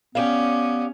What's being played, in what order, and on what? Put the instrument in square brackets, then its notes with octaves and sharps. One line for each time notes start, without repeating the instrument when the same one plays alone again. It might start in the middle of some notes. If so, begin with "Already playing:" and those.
[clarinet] B3 [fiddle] C#4 [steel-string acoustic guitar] G4 D5 F5